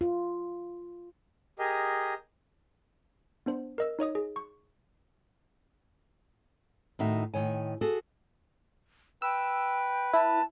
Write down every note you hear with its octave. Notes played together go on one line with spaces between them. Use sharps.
F4
G4 G#4 A#4 D#5
B3 D4 C5
A#4 D#5 E6
D#4 C#5 D#5 D#6
G#4
C#6
A2 D#3 D#4 F#4 E5
A2 D#3 C#5 G#5
F#4 G#4 A4
B4 G5 E6
E4 A5